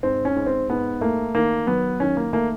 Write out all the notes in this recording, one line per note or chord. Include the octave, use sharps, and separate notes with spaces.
G#2 C4
C#4
G#2
C4
G#2 B3
A3 A#3
D#3 A#3
F#3 B3
D#3 C#4
A#3
A3 A#3